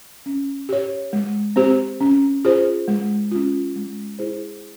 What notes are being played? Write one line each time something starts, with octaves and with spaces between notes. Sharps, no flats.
C#4
G4 C#5
G#3
C4 G4 C5
C#4
F4 G#4 C5
G#3
C#4 F4
G#3
E4 G#4 C5